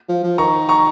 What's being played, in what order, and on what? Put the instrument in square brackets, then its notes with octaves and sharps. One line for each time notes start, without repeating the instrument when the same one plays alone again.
[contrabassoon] F3
F3
[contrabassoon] D#3 [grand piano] A#5 C#6
[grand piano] A#5 C#6